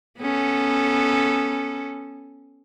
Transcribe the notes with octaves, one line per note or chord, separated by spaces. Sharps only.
B3 C#4 A4